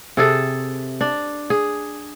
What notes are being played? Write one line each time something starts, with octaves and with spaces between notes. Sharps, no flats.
C3 G#4 A4
D4
G#4